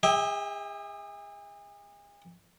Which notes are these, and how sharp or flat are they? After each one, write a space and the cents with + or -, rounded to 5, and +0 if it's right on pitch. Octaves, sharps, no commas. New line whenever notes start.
G#4 -40 E5 -35 G5 +15